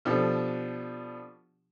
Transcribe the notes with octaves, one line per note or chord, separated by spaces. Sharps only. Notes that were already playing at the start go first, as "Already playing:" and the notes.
B2 F3 D4 G4 A4